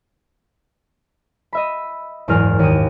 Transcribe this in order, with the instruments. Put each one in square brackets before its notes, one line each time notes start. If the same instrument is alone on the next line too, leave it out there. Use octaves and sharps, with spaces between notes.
[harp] D#5 E5 B5
F#1 E2 G#2 A#4 F6 C7
D#2 D#6